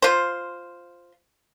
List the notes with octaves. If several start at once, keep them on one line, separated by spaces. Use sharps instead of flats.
F4 C5